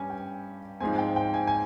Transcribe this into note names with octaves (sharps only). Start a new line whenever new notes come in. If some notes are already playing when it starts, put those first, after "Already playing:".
Already playing: G2 G3 C#4 G#5
G5
G#2 F3 G#3 C4 G#5
G5
G5
G#5
G#5